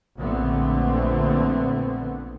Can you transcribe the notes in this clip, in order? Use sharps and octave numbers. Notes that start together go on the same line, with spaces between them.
A#1 A#2 D3 A3 B3 C4